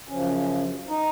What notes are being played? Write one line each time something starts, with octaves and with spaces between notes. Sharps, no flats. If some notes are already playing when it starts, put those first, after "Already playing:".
F#2 C#3 F3 C#4
D#4